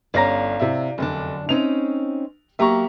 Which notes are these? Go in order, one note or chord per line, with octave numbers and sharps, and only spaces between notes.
G1 C#4 D5 F5 A#5 A#6
C3 E4
F1 F#2 D3 D4
C4 C#4 D#4 F7
F#3 A#3 G4 E5 A#5 C#6